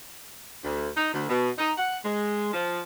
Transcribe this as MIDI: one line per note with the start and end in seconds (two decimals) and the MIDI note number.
0.64 0.89 38
0.96 1.13 63
1.14 1.26 38
1.29 1.50 47
1.58 1.72 63
1.77 1.97 78
2.05 2.52 56
2.53 2.81 53